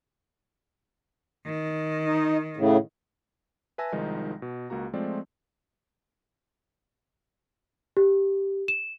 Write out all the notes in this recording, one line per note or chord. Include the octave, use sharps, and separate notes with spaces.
D#3
D#4
A2 C#3
B4 E5 G#5 A5 E6 A#6
C2 D#3 F3 G#3 D#4
B2
C#2 A#3 F#4 A#5
F3 G#3 A3 C4 F4 D5
G4
E7